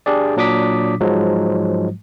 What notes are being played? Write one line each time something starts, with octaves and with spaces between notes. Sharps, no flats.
D4 G4 G#4 D5
A#2 F#3 D4 D6 D#6 B6
G#2 F3 F#3 G#3